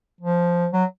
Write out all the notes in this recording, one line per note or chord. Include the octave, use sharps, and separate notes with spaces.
F3
F#3